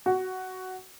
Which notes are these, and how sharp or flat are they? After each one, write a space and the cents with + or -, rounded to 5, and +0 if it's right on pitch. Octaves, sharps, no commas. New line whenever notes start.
F#4 +10